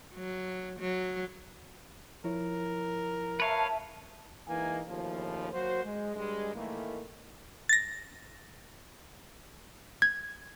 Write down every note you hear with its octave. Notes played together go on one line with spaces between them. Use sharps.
F#3
F#3
F3 E4 A#4 C#5
B4 C#5 E5 F5 A5
E3 G#3 A#3 D#4 G#5
D#2 A2 C#3 F3
F#3 A#3 F#4 C5
G#3
G2 G3 G#3
A2 D#3 E3 A3 A#3
A6 A#6
G#6